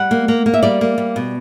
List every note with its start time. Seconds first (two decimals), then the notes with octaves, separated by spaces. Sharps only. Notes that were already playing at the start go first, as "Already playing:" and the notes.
Already playing: G3 F#5
0.11 A#3
0.28 A#3
0.46 A#3
0.54 E5
0.63 G3 D5
0.81 A#3
0.98 G3
1.16 B2